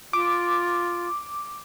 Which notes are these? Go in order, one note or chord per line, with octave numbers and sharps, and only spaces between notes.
F4 D6